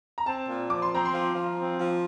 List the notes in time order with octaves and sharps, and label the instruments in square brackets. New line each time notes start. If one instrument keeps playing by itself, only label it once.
[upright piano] A#5
[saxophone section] C4 [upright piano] A5
[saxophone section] A#2
[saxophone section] F3 [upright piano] D6
[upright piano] C6
[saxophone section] C4 [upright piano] A#5
[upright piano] C6
[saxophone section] F3
F3
C4
F3